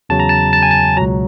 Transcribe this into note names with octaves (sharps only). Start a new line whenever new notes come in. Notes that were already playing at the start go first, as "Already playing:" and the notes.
E2 C#3 F#3 A5
A#5
A5
A5
G#5
A5
C#2 B2 F#3 A#5